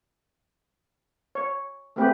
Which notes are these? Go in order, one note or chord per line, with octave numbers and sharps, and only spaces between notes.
C#5
A3 B3 C4 G4 G#4 B4